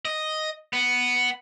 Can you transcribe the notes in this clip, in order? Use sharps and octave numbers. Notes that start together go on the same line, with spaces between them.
D#5
B3